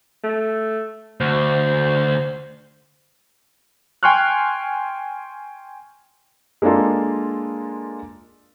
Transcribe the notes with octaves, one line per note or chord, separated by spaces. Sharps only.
A3
D2 C5
G5 G#5 C6 C#6 F6 F#6
G#3 A#3 D4 F4 A4